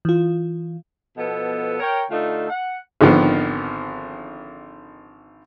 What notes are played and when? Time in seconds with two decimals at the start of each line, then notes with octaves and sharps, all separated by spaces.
0.05 E3 F4
1.17 B2 F3 B3 A4
1.79 A#4 C#5 G5
2.11 D3 A3 D#4 F4 A4
2.50 F#5
3.01 G#1 D3 D#3 F3 B3